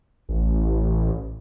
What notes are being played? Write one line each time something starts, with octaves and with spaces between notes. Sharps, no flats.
A1